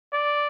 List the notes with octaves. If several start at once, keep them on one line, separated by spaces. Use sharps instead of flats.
D5